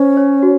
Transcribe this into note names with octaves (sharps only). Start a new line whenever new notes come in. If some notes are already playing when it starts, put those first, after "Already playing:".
Already playing: C#4 C5
C#5
F#4